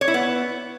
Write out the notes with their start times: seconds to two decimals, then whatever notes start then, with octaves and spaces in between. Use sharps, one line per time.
0.01 C#5
0.08 E4
0.14 B3